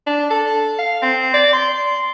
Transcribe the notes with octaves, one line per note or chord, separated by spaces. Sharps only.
D4
A4
F5
C4
D5
C6